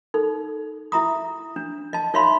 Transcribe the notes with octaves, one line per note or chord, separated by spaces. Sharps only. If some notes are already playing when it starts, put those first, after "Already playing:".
D#4 A4
E4 E5 A#5 D#6
D4
D#5 A5
D#4 C#5 E5 F5 B5 C6